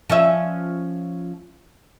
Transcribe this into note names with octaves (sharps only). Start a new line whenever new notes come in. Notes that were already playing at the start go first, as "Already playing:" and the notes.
F3 C#4 E5